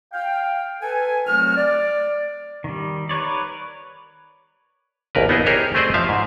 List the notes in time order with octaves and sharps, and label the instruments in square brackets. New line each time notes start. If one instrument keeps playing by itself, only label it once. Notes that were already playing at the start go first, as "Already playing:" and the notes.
[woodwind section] F5 G5
A4 B4 G#5
C2 F#3 A3 C4 F#4 F6
D5
[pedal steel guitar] D#3 G3
A#4 B4 C#5 D5
[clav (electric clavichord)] A#1 D#2 A#4 B4
B3 D#4 E4 G#4 D#5
G4 G#4 A#4 C5 C#5
A3 C4 G#4 C5 D5 D#5
F3 E5 F5
G#2